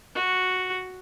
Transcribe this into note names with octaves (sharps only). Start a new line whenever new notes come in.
F#4